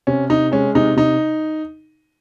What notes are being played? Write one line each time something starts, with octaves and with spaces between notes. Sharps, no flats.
C3 C#4
C3 D#4
G#3 C#4
C3 D#4
C3 D#4